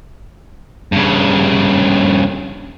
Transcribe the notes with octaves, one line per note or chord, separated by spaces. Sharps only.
G2 C#3